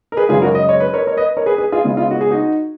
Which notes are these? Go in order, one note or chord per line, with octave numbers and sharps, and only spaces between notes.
A#4
G#4 B4
F#2 C#3 G#3 F4 G#4
F#4 A#4
D#5
C#5
B4
A#4 C#5
A#4 C#5
B4 D#5
A#4 C#5
G#4 B4
G#4 B4
F4 G#4
C#3 G#3 B3 F4
F4
F#4
G#4
D#4 F#4